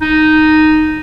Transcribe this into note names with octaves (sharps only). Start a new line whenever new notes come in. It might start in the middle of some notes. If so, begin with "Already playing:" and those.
D#4